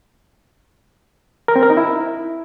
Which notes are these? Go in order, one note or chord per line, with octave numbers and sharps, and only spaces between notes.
A#4
C4
A#4
D#4
E4